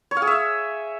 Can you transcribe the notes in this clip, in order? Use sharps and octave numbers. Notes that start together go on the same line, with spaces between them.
C#5
F5
G#4
E5